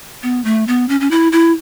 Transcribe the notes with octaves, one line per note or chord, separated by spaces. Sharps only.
B3
A3
B3
C#4
C#4
E4
E4